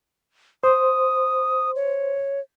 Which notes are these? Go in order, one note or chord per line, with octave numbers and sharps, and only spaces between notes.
C5 D#6
C#5